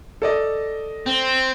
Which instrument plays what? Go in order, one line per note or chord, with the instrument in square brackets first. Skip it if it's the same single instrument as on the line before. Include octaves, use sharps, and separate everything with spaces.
[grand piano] A4 D5 D#5
[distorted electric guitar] C4